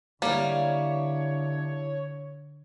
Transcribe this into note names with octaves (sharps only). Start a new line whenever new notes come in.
D3 G3 A#3 E4 C#5 D5 F5